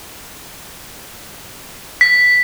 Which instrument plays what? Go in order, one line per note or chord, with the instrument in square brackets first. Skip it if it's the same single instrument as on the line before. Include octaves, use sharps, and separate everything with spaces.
[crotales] B6